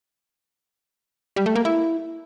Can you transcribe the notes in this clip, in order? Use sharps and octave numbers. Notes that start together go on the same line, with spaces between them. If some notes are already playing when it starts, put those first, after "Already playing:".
G3
A3
A#3
E4